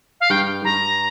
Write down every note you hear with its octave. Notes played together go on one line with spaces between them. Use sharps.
F5
G2 G5
G2 A#5